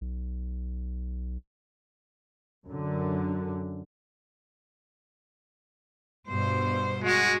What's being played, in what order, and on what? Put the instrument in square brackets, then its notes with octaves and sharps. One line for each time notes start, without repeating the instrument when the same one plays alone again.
[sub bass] B1
[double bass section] F#2 D3
[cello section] G2 B2 C5
[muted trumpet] G#3 [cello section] F#4